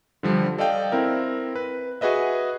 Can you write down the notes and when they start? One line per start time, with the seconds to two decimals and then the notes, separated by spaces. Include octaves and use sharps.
0.23 D3 F3 G3
0.58 A4 D5 D#5 F5 G5
0.92 C4 E4 A#4
1.55 B4
2.01 F#4 G#4 B4 D#5 E5